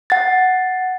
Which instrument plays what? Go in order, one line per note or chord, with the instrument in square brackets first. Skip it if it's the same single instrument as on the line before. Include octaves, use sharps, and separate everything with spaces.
[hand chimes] F#5 A6